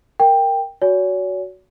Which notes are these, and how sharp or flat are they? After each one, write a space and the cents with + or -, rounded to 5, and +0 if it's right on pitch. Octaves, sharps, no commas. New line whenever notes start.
A#4 +0 G5 +10
F#4 +0 C#5 +40 G#5 +0